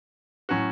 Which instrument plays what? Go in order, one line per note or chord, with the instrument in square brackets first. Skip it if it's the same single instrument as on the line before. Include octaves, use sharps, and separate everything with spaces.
[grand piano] A2 F#3 C#4 F#4